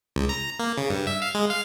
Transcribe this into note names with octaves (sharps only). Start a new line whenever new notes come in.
C#2
A#5
A#3
C#3
G2
E5
F5
G#3
F5